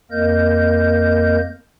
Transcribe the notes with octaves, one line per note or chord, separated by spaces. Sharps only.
F2 A#3 A#4 D#5 G6